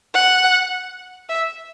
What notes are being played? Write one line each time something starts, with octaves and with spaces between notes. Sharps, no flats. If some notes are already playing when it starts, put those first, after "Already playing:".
F#5
E5